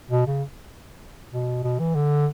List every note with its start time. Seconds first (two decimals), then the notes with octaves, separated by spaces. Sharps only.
0.11 B2
0.27 C#3
1.33 B2
1.63 B2
1.79 E3
1.95 D3